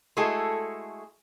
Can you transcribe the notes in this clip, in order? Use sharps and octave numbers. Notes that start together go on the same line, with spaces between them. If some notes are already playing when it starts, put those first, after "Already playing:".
G#3 A3 E4 F#4 G#4 A4